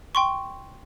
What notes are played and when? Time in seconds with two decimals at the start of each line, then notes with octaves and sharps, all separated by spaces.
0.15 G5 C6 C#6